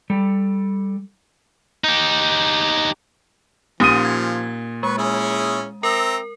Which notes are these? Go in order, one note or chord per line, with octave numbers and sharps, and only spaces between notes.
G3 A4
D#4 G4
A#2 F3 C#4 D#4 G4 D#6 D#7
G#6
G#3 B4 C#6
C#4 E4 G#4
C4 A#4 E5 A#5